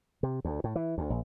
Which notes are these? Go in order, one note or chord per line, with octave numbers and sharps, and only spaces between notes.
C3
D2
A2
E3
D2
A#1